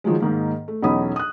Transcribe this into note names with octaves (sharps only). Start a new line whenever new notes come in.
D#3 F3 F#3 G#3
G#2 D#3 A#3
A3
B1 E2 C#4 D#4 B5 D#6
D#6 F#6